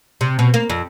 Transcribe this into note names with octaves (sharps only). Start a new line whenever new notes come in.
C3
B2
A#3
F2